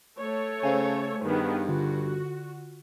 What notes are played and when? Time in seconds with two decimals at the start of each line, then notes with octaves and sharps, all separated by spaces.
0.20 A3 A4 C#5
0.63 C#3 C5 F5 G#5
1.24 G2 D#3 B3 G#4
1.68 D3 F4 F#4